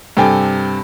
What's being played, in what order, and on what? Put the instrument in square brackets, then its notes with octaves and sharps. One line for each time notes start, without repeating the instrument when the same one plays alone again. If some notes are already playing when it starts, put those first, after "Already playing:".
[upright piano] G2 C3 A4 G5 G#5